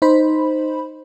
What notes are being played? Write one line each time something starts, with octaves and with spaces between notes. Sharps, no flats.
D#4 C5 B5